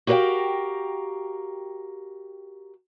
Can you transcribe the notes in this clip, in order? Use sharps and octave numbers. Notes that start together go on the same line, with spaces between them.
F#4 G4 A#4 C5 F5 G5